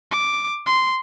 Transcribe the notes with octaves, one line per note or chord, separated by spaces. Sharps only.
D6
C6